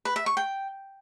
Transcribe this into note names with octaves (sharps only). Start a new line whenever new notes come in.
B4
E5
C#6
G5